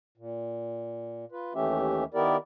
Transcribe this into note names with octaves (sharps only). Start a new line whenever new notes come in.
A#2
F4 B4
D#2 E3 A3 C#4 G4 E5
D#3 B3 E4 G4 A#4 D5